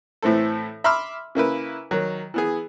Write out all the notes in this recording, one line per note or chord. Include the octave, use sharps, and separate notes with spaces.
A2 E3 A3 C4 A4
E5 B5 C6 D6 E6 F6
C#3 A#3 E4 B4
D#3 F#3
E3 B3 G#4